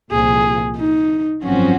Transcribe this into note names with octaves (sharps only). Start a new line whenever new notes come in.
C2 A#2 F3 G#4
D#4
G#1 F#2 F3 C4 C#4 F#4